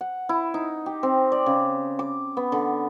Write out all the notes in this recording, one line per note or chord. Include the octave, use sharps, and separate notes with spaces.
F#5
E4
D#4
G4
C4
D5
C#3
D6
B3
D3